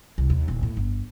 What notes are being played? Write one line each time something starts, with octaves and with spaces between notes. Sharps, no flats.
C2
D#2
D#1
A2
G1